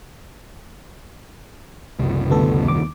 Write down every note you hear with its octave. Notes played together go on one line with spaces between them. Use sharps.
F#1 C2
D2 B3 A4
D#2 D6